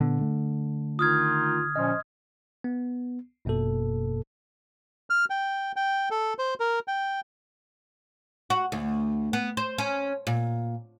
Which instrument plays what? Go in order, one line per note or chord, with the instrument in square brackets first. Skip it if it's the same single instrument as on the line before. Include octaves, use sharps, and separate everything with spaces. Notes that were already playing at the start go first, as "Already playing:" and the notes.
[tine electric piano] A#2 B3 [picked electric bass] D3
[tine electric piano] A3
[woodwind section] D#3 D#4 F4 [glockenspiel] D#6 F6 G#6
[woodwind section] A#2 F3 C#4 [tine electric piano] D#5 C6
[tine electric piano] B3
G1 F#2 B2 A#3 A4
[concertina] F6
G5
G5
A4
C5
A#4
G5
[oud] F#4
D2
B3
C5
C#4
A#2